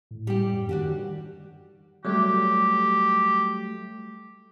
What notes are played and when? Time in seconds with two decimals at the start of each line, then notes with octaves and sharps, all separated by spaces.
0.11 A2
0.27 G3 G4
0.52 F#2
0.69 D#3 D4 F#4 G4
2.05 F#3 G3 A3 G4